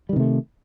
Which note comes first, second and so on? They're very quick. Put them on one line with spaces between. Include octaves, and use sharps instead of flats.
G3 D#3 C3 A3